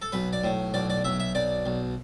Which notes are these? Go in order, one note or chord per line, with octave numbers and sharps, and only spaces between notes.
A4
B1 B4
D5
A2
B1 D5
D5
B1 E5
E5
B1 D5
B1